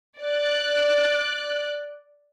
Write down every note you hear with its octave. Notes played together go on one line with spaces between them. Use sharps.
D5 F#6